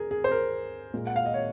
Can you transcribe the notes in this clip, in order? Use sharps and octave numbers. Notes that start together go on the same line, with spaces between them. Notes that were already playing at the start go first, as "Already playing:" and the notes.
Already playing: G#4 A#4
G#4
C5
A#4
A#2 G#3
F#5
F5
D#5
C#5